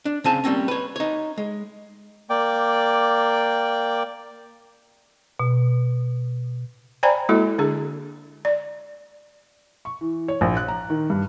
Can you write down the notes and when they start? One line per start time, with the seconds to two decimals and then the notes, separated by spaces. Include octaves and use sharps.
0.05 D4
0.24 C#3 C4 G#5 A5
0.44 G3 A#3 C4 C#4
0.68 B4 C#5
0.96 D#4 C#5
1.38 G#3
2.30 A#3 D5 G5 D6
5.40 B2
7.03 C5 D5 G5 G#5 A#5 B5
7.29 G#3 A#3 E4 F#4 A4
7.58 D3 D4 G#4
8.45 D5
9.85 C#6
10.01 E3
10.28 C#5
10.41 A#1
10.57 F#6
10.68 A#5
10.90 D#3
11.10 G2